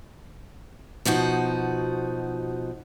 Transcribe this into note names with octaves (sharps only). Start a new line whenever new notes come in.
B2 F3 D#4 F#4